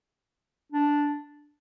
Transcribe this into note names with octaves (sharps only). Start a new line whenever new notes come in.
D4